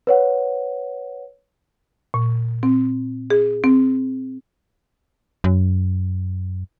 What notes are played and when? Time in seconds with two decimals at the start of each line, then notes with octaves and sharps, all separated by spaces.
0.07 B4 C#5 F#5
2.14 A#2
2.63 C4
3.30 G#4
3.64 C4
5.44 F#2